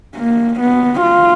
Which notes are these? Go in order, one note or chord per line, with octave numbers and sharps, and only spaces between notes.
A#3
B3
F4